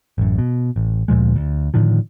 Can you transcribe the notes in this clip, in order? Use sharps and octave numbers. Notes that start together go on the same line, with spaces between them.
A1 F#2
B2
A1
D2 A#2 F3 G#3
D2
A2 D3 D#3 F3